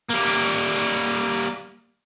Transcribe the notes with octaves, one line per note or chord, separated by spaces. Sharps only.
G3 A#3